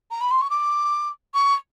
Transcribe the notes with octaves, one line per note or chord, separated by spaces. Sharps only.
A#5
B5
C6
C#6
D6
C#6